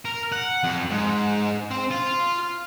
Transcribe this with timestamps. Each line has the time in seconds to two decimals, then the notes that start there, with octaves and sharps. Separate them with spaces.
0.05 A#4
0.32 F#5
0.64 F2
0.91 G#2
1.71 C4
1.91 F4